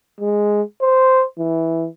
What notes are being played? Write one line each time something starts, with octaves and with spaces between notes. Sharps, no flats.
G#3
C5
E3